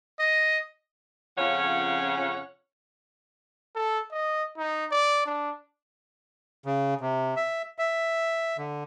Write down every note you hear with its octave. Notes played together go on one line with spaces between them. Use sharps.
D#5
F2 C#3 F3 C#4 C#5 F#5
A4
D#5
D#4
D5
D4
C#3
C3
E5
E5
D3